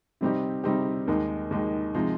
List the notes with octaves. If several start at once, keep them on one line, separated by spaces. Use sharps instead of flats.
C3 G3 C4 D#4 G4
C3 G3 C4 D#4 G4
D#2 D#3 G#3 D#4
D#2 D#3 G#3 D#4
C3 F3 G#3 D#4